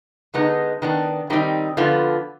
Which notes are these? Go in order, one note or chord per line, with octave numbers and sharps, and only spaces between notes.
D3 G#3 B3 D#4
D#3 B3 D4
D#3 G3 C4 D#4
D3 F3 B3 F4